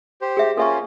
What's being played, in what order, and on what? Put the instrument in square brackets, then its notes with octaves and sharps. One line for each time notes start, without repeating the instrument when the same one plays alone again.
[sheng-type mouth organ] G4 C5
[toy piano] G#4 E5
[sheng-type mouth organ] A#3 C#4 F4 [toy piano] A4 E5 C#6